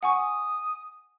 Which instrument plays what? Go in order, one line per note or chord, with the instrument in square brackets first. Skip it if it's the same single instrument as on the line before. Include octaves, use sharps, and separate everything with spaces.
[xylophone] F#5 G#5 C#6 [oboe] D#6